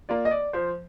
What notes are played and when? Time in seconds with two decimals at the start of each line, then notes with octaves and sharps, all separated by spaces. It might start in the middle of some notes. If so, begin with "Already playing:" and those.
0.09 A#3 F4 D5
0.25 D#5
0.31 D5
0.53 F3 C5